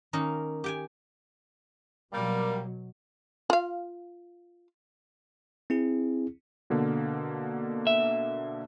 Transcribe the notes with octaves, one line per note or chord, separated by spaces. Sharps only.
D#3 A#3 C#4 D#4
G4 G5 G#5
B2 F#3 G3 A#3
F4 F5
C4 E4 G#4
B2 D3 A#3
E5